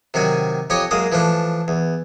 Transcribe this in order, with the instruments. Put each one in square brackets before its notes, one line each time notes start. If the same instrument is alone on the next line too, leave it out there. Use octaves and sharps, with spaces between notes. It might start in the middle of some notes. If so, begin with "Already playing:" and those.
[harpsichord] C3 D#3 F#3 G#5
F2 G4 C#5 D#5 G#5
F#2 G#3 A#3 D#6
E3 F3 A3 D4
E2